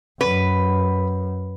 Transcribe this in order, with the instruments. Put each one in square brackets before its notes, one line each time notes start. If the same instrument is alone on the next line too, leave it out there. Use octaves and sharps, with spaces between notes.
[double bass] F#2 [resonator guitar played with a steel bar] B4